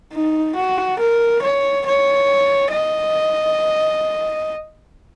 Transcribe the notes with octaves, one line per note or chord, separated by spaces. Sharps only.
D#4
F#4
A#4
C#5
C#5
D#5